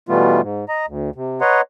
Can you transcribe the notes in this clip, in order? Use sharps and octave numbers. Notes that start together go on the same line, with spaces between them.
B2 E3 G3 A3 B3 F4
G#2
D#5 A#5
D2
C3
B4 C#5 D#5 F#5 A#5 C6